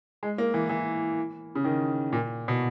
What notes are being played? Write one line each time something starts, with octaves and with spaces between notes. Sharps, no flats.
G#3
A#3
E3
E3
C#3
D#3
A#2
B2